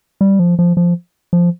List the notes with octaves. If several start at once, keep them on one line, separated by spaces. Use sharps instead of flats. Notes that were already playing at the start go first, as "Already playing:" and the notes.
G3
F3
F3
F3
F3